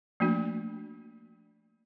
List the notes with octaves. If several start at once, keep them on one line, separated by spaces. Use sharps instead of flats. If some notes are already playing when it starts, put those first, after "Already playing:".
F3 A3 A#3 D4 F#4